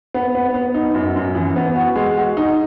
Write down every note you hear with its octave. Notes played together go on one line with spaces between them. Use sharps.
B3
B3
B3
D#4
F#2
F#2
E3
B3
F#4
G#3
F#4
D#4